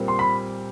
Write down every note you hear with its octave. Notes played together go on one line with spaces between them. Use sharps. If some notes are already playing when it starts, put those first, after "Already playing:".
Already playing: A#2 G3 C4
C6
B5